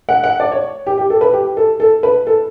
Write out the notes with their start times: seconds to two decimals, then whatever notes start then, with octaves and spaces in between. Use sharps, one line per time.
0.09 F#5
0.24 F#5
0.40 D5
0.52 C#5
0.87 G4
0.98 G4
1.10 A4
1.21 B4
1.33 G4
1.57 A4
1.80 A4
2.03 B4
2.27 A4